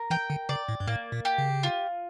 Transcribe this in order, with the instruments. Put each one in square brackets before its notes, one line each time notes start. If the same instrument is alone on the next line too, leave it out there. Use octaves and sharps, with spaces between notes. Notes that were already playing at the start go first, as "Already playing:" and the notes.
Already playing: [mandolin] A#4
[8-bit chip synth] E3 [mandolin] G5
[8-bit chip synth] D3
[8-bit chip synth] C#3 [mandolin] D5
[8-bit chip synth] A2
G2
[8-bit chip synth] A2 [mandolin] A#3
[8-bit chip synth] A#2
[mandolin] G4
[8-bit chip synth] C#3
[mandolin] F4